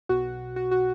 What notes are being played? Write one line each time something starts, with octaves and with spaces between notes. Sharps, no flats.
B1 B2 F#4
F#4
F#4